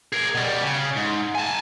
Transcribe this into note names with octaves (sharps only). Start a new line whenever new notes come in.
G#4 A#4
B2 G3
C#3
G#2
G#5 A5